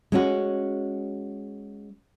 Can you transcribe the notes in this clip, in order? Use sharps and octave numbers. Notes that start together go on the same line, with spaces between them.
G#3 C#4 F#4